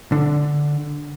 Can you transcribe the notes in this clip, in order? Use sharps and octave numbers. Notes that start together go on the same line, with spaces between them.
D3